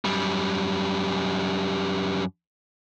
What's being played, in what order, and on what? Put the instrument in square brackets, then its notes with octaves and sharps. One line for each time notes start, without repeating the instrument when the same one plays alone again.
[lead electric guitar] F#2 G3